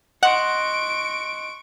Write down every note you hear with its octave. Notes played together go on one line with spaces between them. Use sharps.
D#5 F#5 C6 C#6 F#6 D7